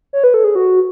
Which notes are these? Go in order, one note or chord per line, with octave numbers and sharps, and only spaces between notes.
C#5
B4
A4
G#4
F#4